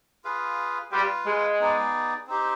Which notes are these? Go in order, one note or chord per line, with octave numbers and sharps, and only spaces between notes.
F4 G#4 B4 F5
G3 F4 B4 F5
G#3
B3 D#4 G#4 D5
C4 D#4 G4 C5